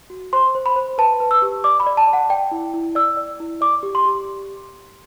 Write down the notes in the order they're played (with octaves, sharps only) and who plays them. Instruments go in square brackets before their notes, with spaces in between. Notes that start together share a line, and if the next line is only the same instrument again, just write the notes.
[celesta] F#4
C5 C6
C5
B5
C5
B4 A5
B4
E6
G4
D5 D6
B5
D5
A5
D5
F#5
D5 G5
E4
E4
D5 E6
D5
E4
D5 D6
G4
C6
G4